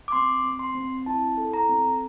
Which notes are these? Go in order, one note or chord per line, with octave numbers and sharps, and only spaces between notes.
D6
C4 C6
C4
C6
C4
E4 A5
A4
A#5
C4